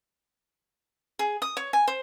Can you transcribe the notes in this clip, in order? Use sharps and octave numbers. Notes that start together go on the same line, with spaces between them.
G#4
D#6
C#5
G#5
C5